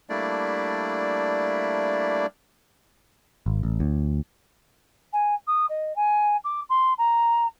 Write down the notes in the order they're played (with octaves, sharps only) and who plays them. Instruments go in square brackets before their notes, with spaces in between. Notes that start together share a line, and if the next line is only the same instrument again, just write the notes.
[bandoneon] G3 A3 A#3 D4 E4 D5
[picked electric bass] G#1
A1
D2
[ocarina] G#5
D#6
D#5
G#5
D6
C6
A#5